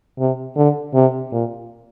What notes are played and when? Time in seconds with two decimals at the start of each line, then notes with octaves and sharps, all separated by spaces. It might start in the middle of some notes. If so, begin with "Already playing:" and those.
0.19 C3
0.56 D3
0.94 C3
1.32 A#2